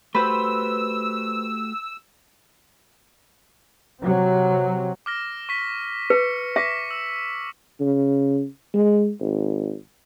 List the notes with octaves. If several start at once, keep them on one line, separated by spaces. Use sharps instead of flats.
A3 F#4 G4 B4 C5 E6
C3 F#3
D6 F6 A#6
C#6 B6
B4 C#7
E5 C#6 D6 B6
E6
C#3
G#3
G#1